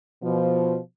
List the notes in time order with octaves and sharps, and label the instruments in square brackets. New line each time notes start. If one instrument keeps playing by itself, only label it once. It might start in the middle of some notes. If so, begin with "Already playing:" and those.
[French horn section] B2 F3